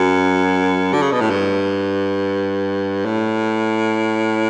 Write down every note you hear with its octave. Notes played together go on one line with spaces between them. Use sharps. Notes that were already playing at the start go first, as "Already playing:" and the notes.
Already playing: F#2
D3
C#3
B2
A2
G2
A2